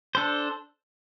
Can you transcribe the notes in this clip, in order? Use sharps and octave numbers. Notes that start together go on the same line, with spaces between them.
D4 A4 C5